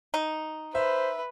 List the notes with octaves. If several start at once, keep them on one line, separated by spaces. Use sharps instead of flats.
D#4
B4 C5 E5